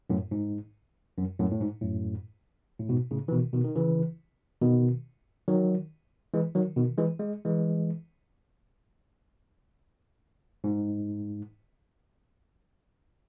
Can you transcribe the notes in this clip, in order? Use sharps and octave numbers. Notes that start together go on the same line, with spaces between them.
F#2 A2
G#2
F#2
F#2 A2
A2
G#2
F#2 A2
A2
G#2 B2
A2 C#3
E3
B2 D#3
B2 D#3
D#3
C#3 E3
B2 D#3
D#3 F#3
E3 G#3
D#3 F#3
B2 D#3
E3 G#3
G#3
E3 G#3
G#2